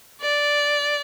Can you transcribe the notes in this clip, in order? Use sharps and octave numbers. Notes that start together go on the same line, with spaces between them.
D5